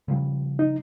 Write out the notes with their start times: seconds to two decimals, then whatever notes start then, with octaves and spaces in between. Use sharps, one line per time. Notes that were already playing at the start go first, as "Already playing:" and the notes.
0.08 C#3 F3 G3
0.59 D#4